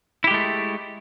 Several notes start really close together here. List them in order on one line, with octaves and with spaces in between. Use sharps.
E4 G4 G#3 A3